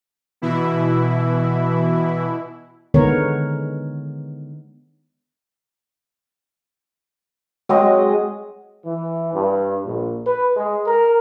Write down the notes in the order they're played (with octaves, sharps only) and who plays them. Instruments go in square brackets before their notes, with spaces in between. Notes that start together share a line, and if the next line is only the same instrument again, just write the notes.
[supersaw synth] B2 E3 E4
[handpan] D3 D#3 G#3 B3 A#4 C#5
[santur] F#3 C4 D#5 [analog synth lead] G#3
[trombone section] E3
G2
A#1
B4
G#3
A#4